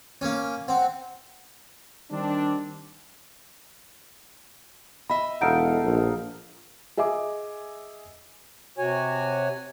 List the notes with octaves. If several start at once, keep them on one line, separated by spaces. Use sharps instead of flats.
A#3 C#4
C4 F#5
D#3 G3 C4 D4
D#5 E5 B5
E1 D#4 A4 F5 F#5 D7
A#1
G#4 D#5 E5 G#5 D6
C3 F#4 C#5 G#5